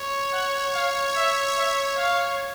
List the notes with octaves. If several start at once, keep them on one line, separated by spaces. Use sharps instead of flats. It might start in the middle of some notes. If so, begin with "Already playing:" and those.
Already playing: C#5
F#5
F5
E5
E5
F5